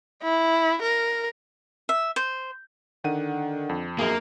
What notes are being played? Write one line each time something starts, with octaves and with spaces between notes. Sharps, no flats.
E4
A#4
E5
C5
D3 D#3 F#5 D#7
F2
A#1 F#2 A#3 G#4